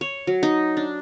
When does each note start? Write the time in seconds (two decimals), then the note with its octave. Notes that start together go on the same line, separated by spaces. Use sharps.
0.01 C#5
0.27 F#3
0.43 D#4
0.77 D4